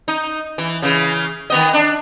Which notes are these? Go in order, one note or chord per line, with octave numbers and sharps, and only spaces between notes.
D#4
E3
C#3 E3
D#3 B3 D#5
D4